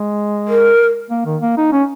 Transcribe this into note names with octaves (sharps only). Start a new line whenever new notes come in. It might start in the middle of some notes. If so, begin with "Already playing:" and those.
Already playing: G#3
A#4
A#3
D#3
A#3
D#4
C#4